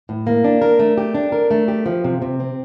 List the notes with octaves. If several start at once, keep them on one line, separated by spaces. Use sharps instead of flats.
A2
A#3
D4
A#4
A3
G4
D4
A#4
A3
G4
F3
C3
C3
C4